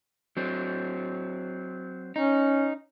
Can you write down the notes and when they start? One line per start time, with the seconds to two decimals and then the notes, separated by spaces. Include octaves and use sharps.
0.37 F#3 C4
2.16 C#4 D#4